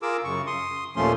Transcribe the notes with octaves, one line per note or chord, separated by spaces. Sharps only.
F4 G#4 A#4 D6 E6
F#2 C#3 C#6
C6 D#6
D#2 A#2 F3 A3 C#4 C6